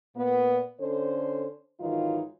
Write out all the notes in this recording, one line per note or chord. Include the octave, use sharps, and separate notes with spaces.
A#2 B3
D3 C#4 A4 C5
G#2 D#3 E3 F#3 D#4 F4